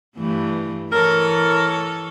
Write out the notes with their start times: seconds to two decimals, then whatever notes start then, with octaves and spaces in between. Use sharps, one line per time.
0.16 G2 E3 A3
0.92 E3 A4 A#4 C#5